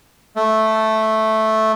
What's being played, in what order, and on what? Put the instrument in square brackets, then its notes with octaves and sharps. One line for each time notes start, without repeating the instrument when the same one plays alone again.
[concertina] A3